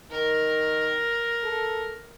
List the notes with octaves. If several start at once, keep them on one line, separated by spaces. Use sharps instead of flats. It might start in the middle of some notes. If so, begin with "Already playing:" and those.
D#3 A#4
A4